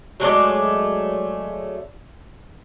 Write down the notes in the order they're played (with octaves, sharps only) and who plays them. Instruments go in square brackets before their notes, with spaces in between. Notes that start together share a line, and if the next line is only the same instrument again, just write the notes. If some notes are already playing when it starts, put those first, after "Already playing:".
[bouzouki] F#3 G#3 A3 D5